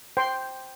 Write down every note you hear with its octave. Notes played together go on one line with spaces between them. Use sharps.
C5 G5 C6